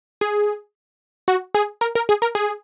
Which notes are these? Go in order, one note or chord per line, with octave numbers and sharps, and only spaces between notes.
G#4
F#4
G#4
A#4
A#4
G#4
A#4
G#4